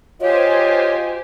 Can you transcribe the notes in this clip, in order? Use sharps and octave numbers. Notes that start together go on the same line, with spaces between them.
F4 G4 C5 C#5 D#5 G#5